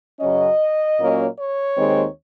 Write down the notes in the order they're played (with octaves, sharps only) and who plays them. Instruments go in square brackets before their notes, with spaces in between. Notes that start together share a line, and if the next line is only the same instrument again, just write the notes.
[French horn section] F#2 C#3 F#3 C#4 D#5
A#2 F#3 A#3 C#4
C#5
D#2 D#3 G#3 C4